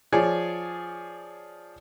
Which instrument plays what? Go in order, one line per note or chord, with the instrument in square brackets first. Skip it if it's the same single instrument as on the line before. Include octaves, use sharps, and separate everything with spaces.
[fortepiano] F3 G#4 C#5 D5